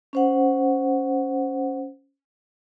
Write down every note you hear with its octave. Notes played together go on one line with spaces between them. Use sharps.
C#4 C5 F#5